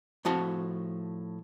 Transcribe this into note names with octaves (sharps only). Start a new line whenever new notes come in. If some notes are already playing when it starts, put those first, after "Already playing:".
A2 F3 C4 F#4 A5